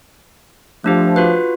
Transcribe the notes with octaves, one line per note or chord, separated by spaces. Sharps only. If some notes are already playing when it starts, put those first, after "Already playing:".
F3 A3 D4 G4
F4 F#4 B4